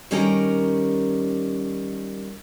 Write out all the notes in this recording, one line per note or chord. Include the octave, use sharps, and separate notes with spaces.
D#3 G3 C#4 A#4 G5 A#5